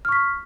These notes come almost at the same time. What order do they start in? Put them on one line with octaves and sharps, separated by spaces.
F6 C#6 B6